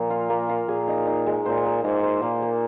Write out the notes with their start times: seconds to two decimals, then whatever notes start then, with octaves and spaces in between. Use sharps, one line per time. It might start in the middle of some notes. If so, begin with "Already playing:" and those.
Already playing: A#2 F3 A#3
0.10 F4
0.30 A#3
0.49 F4
0.68 A#2 G#4
0.88 D#4
1.07 D#4
1.26 G#3
1.46 A#2 C5
1.64 A#3
1.84 G#2 A#3
2.03 C5
2.22 A#2 A#3
2.42 A#3